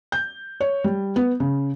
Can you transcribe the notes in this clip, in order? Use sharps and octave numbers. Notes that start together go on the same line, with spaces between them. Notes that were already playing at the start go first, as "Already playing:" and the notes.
G6
C#5
G3
B3
C#3